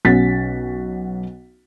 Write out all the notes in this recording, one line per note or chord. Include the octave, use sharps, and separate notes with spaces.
B1 C#4 F#4 A6 B6